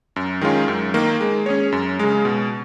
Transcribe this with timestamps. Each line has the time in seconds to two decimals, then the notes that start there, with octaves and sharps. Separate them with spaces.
0.16 F#2
0.41 D#3 G#3 C#4 F4
0.68 F#2
0.94 D#3 A#3
1.21 G#3
1.46 C#4 G#4 C#5
1.72 F#2
1.99 C#3 G#3
2.25 B2